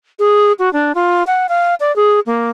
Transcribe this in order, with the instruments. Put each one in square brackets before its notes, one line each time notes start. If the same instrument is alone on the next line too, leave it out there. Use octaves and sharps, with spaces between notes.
[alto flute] G#4
F#4
D4
F4
F#5
F5
D5
G#4
A#3